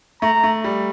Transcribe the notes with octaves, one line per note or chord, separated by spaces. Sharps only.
A3 A#5
A3
G3